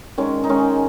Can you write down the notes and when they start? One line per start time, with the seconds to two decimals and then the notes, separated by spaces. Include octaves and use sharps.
0.18 D#3 G#3 C#4
0.44 D#4
0.49 D#3 G#3 C#4